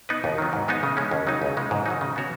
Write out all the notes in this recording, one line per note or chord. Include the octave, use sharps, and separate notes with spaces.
B3 D#4 B4
D#2
D#3 F#3
G#2
G#3 B3 D#4
C#3
G#3 C#4
D#2
C#3 F#3 D#4
C#2
C#3 G#3
G#2
D#3 F#3 D#4
C#3
B3 F#4 C#5